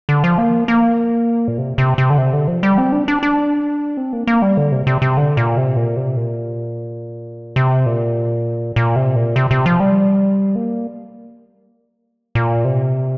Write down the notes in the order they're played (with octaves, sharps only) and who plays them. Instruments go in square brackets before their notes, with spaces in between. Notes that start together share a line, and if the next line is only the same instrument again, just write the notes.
[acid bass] D3
F3
A#3
A#3
A#2
C3
C3
C3
D3
C3
D3
F3
G3
C4
D4
D4
D4
C4
A#3
A#3
G3
D3
C3
C3
C3
D3
A#2
C3
A#2
C3
A#2
C3
A#2
A#2
C3
A#2
C3
C3
F3
G3
A#3
A#2
C3